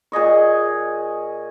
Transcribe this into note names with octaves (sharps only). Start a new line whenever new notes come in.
A#2 G#4 D#5 C#6